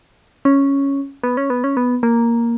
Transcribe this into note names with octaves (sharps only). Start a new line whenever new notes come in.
C#4
B3
C#4
B3
C#4
B3
A#3